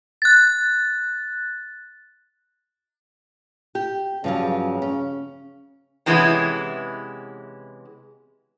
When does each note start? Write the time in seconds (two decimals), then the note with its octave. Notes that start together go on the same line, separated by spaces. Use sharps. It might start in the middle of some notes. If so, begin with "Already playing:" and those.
0.22 F#6 A6
3.75 G4
4.24 G2 C#3 F3 F#3
4.82 C#4
6.06 C3 E3 G#3 B3 C#4 E4